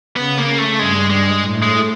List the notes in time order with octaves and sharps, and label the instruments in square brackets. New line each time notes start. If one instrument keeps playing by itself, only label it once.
[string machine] C#3 [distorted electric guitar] B3
[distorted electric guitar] A#3
A3
[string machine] G2 G3 [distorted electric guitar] G#3
[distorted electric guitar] G#3
[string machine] A2 A3
[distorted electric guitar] G#3